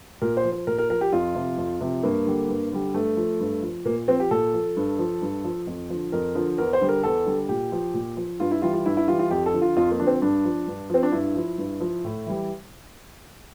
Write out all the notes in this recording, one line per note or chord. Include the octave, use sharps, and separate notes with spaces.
A#2 A#4
C5
F3
C5
A#2 A#4
A#4
F3 A#4
G4
F2 F4
C3 F3
F2
C3 F3
G2 A#3
D3 G3
G2
D3 G3
G2 A3
F3
G2
F3
A#2 A#3
F3 C4
G4
A#2 A4
F3
G2
F3
G2
F3
F2
D3 F3
F2 A#4
D3 F3
E2 A#4
C5
D3 G3
A#4
E2 A4
D3 G3
A#2 G4
F3
A#2
F3
G2 F4
E4
E3 G3 F4
F4
G2 E4
E4
E3 G3 F4
F4
F2 G4
A4
D3 F3
F4
F2 F4
A#3
D3 F3 D4
C4
G2 D4
F3
G2
F3 C4
D4
G2 E4
F3
G2
F3
A2
E3 G3